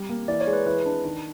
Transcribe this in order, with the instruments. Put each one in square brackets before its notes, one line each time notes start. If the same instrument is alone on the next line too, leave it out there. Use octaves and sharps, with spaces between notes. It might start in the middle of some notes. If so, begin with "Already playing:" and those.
Already playing: [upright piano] G3
A#3
[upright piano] E3 [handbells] D5
[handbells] C#5
[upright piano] G#3
[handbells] B4
[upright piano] E3 [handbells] B4
[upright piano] D4
D#3